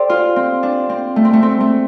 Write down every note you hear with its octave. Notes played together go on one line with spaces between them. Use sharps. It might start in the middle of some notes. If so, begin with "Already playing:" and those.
Already playing: G4 A4 C5 D5
F4
C4
D4
C4
A3
C4
A3
C4
A3